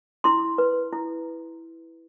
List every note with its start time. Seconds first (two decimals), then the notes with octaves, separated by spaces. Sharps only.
0.24 E4 C6
0.58 B4
0.93 E4